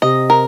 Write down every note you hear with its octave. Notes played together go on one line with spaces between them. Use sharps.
C3 D#5
A#4